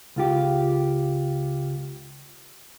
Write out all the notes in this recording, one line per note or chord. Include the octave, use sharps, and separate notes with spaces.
C#2 F4 G4